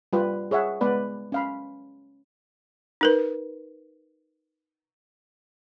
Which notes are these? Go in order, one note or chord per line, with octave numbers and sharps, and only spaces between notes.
G3 F4 B4 G5
G#4 C#5 E5 F#5
G#3 B3 B4 D5
C#4 F5 B5
D#4 A#4 B4